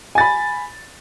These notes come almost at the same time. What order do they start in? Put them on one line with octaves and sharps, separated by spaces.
G#5 A6 B5